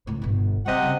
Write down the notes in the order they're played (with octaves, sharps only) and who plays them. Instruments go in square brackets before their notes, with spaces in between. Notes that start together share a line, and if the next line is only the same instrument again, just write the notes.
[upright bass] C#2 A2
G1 B2
[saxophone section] C3 D#5 F#5 [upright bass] G3
[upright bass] C#3 G3